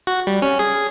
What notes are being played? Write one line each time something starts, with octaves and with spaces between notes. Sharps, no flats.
F#4
G3
C#4
G#4